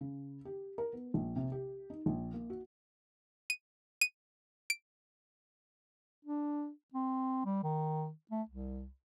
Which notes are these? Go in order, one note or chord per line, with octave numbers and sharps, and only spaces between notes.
C#3
G4
A#4
B3
A#1
C3
G4
D#4
A#1
A#3
F#4
D#7
D#7
D7
D4
C4
G3
D#3
A3
C2